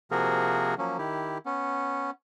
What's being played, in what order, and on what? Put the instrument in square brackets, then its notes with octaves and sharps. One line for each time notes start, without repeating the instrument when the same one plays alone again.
[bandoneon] C3 F3 A#3 F#4 G#4 A#4
F3 F#3 A#3 C#4
D#3 E4 G4
B3 C#4